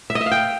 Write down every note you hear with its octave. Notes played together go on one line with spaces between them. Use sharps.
E5
D#5
E5
F5
G5